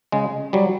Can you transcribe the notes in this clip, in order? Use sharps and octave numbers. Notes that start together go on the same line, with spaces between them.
C#3 G#3
F#3 G3